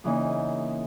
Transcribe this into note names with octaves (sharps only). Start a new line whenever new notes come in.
E2 C#3 E3 A#3 D#4